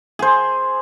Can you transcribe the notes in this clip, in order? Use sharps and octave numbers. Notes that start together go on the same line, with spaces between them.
G#4 C5